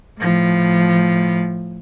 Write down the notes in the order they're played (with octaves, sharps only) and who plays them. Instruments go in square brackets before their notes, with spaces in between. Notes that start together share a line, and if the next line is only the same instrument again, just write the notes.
[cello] A2 F3